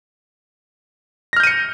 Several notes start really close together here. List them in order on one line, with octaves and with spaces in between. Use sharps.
A#6 F6 G6 D#7 C#7